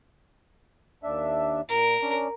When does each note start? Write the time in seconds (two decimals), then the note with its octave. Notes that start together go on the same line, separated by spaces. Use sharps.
1.03 D#2 D4 E5
1.69 A#2 A#4
2.02 C#4 D4